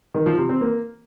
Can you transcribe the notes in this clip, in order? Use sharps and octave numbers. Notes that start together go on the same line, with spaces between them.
D#3
F3
C3
C4
A#3